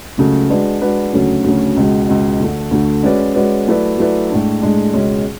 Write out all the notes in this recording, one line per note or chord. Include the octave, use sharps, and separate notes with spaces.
C#2 C#3 F#3 A3
G#3 D4 F#4 B4 D5
G#3 D4 F#4 B4 D5
D2 C#3 F#3 A3 C#4
D2 C#3 F#3 A3 C#4
C#2 B2 G#3
C#2 B2 G#3
D2 D3 A3
D2 D3 A3
G#3 C#4 F#4 B4 D5
G#3 C#4 F#4 B4 D5
F#3 A3 E4 B4 D5
F#3 A3 E4 B4 D5
A2 G#3 D4
A2 G#3 D4
C#2 B2 G#3 C#4